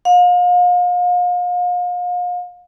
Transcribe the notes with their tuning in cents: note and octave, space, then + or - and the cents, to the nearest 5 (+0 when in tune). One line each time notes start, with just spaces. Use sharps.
F5 +35